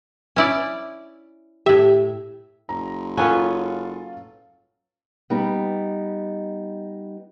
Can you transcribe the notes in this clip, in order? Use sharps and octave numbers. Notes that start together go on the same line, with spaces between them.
C#4 E4 D5
A2 G4 E5
F#1 A#5
F#3 B3 C#4 F4 A4 F5 G#5
G3 B3 D#4